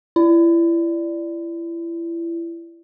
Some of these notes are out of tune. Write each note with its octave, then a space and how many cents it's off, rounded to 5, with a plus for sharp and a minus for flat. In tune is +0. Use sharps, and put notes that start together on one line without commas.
E4 +30 D5 +0